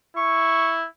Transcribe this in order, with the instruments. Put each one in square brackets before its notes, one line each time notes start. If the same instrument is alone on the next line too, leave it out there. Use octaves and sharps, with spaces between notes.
[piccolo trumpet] E4 [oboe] C#6